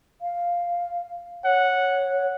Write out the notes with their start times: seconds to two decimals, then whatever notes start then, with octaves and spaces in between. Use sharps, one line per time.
0.22 F5
1.45 C#5 F#5